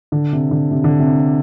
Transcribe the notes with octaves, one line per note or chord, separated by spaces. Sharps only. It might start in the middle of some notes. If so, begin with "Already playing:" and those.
D3
C3
D3
C3
D3
C3